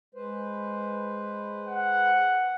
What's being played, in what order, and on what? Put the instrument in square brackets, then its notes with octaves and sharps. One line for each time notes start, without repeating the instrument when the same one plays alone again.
[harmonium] G#3 B4 C5
[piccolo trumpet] F#5